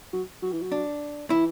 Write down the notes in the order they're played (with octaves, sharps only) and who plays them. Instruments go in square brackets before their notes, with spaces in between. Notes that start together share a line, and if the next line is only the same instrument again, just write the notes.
[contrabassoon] F#3
F#3
E3
F#3
[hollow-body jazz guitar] D4
[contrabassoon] E3 [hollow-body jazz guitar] E4